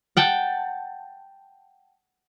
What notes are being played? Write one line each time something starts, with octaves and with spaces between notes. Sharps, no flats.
F#5 G5 A5